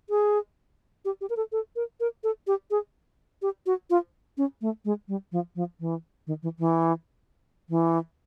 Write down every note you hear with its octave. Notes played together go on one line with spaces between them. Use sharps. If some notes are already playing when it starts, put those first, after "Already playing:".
G#4
G4
G4
A#4
A4
A4
A#4
A#4
A4
G4
G#4
G4
F#4
F4
C#4
A3
G#3
G3
F3
F3
E3
D#3
E3
E3
E3